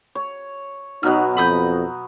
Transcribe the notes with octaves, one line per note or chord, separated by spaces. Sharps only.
C#5
B2 F#3 B3 D#4 F6 F#6
F2 B5 D#6 G6